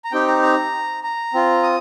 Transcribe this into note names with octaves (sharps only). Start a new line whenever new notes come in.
A#5
C4 D#4 G4 G5
A#5
A#5
A#5
C4 F4
D#6